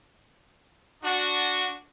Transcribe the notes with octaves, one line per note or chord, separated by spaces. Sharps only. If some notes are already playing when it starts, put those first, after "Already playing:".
D4 F#4